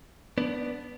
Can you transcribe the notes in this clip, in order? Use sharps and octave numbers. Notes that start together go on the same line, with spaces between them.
B3 D4